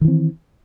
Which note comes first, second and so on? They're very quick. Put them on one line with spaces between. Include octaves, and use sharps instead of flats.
D#3 E3 C4